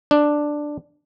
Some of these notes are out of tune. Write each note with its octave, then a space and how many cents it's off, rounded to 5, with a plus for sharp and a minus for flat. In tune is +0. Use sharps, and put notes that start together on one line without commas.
D4 +5